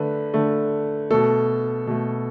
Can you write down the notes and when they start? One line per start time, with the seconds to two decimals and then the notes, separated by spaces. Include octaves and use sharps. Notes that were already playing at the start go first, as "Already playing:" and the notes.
Already playing: D3 A3 B4
0.34 D3 A3
1.10 B2 A3 A4
1.87 B2 A3